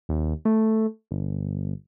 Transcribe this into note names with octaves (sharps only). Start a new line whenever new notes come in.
D#2
A3
G1